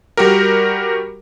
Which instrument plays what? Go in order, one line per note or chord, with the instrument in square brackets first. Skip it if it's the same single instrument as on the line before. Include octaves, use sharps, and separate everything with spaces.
[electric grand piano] G3 F#4 G4 A#4